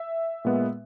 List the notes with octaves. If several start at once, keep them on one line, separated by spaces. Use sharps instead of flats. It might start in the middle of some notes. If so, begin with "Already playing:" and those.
Already playing: E5
A#2 G#3 B3